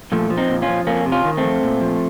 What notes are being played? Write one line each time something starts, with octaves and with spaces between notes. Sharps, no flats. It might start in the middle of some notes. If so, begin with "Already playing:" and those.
A#2 F3 A3
F3
C4 D#4
A#2
C#4 F4
F3
F2 A#3 C#4
C3
C#4 F4
D#3
A3 C4
F2
A#2
F3